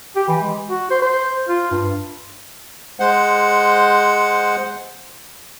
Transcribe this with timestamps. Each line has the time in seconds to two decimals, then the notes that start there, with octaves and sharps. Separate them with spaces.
0.16 G4
0.28 E3
0.41 G#3
0.70 F#4
0.90 C5
1.02 C5
1.48 F4
1.71 G2
3.00 G#3 C5 F#5